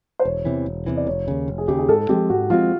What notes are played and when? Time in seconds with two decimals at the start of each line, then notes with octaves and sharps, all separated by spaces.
0.19 C5
0.24 E1 C#5
0.45 E2 C3 E3
0.66 E1
0.86 E2 C3 E3
0.97 D5
1.07 F1 C#5
1.28 D#2 C#3
1.48 F1
1.58 G#4
1.68 D#2 C#3 G4
1.78 G#4
1.89 G#2 A4
2.09 F3 G#3 C4 G4
2.30 G#2 F#4
2.50 F3 G#3 C4 F4